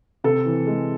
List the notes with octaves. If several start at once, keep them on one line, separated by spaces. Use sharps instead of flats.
C3 A4
E3
G#3